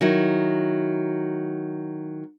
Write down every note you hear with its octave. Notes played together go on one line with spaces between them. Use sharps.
D#3 F#3 E4